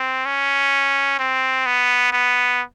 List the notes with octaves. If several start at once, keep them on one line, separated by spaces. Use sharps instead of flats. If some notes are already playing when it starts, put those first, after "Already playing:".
Already playing: C4
C#4
C4
B3
B3